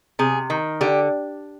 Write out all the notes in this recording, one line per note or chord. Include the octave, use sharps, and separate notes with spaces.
C3 G#4
D#3
D3 G4